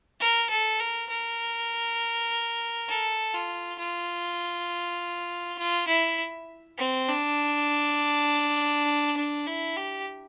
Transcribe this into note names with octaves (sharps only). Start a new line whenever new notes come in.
A#4
A4
A#4
A#4
A4
F4
F4
F4
E4
C4
D4
D4
E4
G4